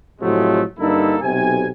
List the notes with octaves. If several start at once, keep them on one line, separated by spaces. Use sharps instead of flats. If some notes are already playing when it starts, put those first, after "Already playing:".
A2 C3 F3 F#3 G#3 A3
G2 D3 A#3 D#4 E4 A4
B1 C3 G#5